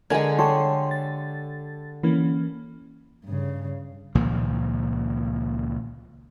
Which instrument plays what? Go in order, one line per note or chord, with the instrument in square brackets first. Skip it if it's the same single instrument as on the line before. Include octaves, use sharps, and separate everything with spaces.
[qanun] D3 G#3 [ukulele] A#4 G#5 [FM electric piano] G#6
[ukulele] G4 A4 C#5 [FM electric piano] C6
[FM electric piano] A6
E3 A#3 C#4
[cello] G2 C#3
[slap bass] C#2 A#2 D#3 F3